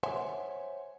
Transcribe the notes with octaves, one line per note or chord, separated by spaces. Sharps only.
C5 C#5 E5 F#5 G#5 C6